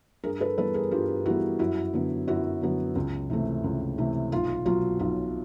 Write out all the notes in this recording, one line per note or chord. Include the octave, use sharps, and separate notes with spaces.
G2 G#4 A#4
A4 B4
E3 G3 B3 A4 B4
G#4 A#4
G2 F4 G4
E3 G3 B3 E4 F#4
F#2 E4 F#4
D3 F#3 B3
F#2 E4 F#4
D3 F#3 B3
C#2
C3 E3 A3
C#2
C3 E3 A3
B1 F4
B2 F#3 F4
B1 F4